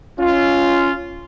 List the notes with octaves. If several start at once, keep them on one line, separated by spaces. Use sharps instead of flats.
C#4 F4